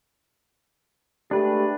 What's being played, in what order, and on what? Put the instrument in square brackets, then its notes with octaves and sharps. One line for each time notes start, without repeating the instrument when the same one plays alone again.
[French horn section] G#3 A3 G4 [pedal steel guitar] D4 B4